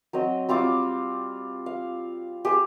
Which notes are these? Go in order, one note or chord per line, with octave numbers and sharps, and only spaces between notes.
F#3 C4 D#5
G3 C4 F4 D6
F5
G4 G#4 C5